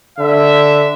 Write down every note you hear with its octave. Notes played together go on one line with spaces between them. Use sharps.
D3 E5